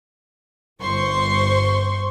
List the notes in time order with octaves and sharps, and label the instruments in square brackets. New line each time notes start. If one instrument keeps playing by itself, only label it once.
[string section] G1 C5 C6 C#6